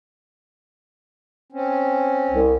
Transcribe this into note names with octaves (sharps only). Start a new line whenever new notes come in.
C4 C#4
C2